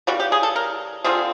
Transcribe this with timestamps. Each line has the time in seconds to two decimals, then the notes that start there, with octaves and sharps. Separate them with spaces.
0.07 C#3 E3 G3 F#4
0.20 G4
0.32 G#4
0.43 A4
0.56 A#4
1.04 D3 G3 C4 F4 G#4